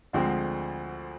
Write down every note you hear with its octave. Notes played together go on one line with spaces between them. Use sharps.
D2 D3 F3 G#3 C4